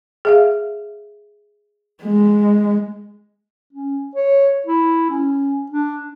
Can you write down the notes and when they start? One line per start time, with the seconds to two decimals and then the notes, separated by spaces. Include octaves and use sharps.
0.25 G#4 E5 F5
2.03 G#3
3.73 C#4
4.15 C#5
4.66 E4
5.09 C#4
5.71 D4